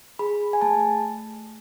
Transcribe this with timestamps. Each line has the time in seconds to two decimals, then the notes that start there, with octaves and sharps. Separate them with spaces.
0.19 G#4 B5
0.53 G#5
0.61 A3 A5